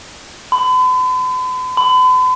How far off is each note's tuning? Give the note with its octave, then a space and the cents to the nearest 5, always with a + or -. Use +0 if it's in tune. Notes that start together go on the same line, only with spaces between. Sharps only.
B5 +45
B5 +45